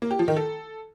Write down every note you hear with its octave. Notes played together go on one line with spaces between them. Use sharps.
A#3
G4
F3
D#3
A4